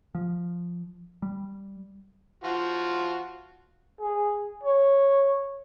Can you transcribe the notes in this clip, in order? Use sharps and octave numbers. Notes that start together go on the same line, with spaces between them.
F3
G3
F3 F4 F#4
G#4
C#5